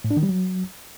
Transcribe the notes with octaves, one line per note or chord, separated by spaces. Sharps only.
A2
D4
D#3
G3
F#3